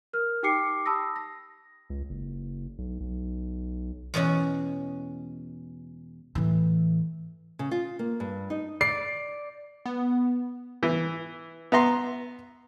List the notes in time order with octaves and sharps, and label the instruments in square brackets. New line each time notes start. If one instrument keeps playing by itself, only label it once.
[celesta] A#4 F6
D#4 G4 G5 D6 C7 C#7
A5 B5 D#6 E6 A#6
A#6
[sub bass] C#2
F#1
B1
B1
[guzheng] E2 B2 G#3 C#4 F#4
[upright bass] A2 E3
[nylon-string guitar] C#3
F4
A#3
G2
D#4
[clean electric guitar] D5 [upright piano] C7
[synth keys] B3
[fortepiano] E3
B3 E5 A#5 C6